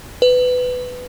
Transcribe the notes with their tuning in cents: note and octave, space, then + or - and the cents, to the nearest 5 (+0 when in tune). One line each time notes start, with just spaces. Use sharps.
B4 +15